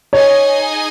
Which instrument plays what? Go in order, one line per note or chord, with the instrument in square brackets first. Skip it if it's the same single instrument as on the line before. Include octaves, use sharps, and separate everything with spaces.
[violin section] D#4 G#4 D#5 G#5 [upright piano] C#5